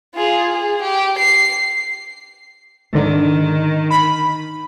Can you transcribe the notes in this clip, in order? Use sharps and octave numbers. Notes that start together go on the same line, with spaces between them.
F4 G#4
G#4
G4
C7
G#2 D3 D#3
B5